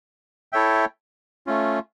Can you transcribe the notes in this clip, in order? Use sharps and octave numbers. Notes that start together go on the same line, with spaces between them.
E4 A4 C#5 E5 G5
A3 C#4 F4